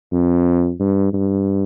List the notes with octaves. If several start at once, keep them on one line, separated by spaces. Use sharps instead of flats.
F2
G2
G2